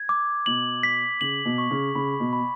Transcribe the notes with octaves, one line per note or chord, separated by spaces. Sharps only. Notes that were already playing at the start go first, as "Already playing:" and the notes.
Already playing: G#6
D6
B2 F#7
B6
C#3 F#7
B2
C#6
C#3
C#3 B5
B2
B5